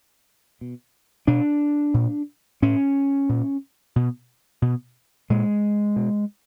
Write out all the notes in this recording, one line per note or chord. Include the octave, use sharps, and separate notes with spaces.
B2
B2 D4
A#2
A2 C#4
A#2
B2
B2
A#2 G#3
B2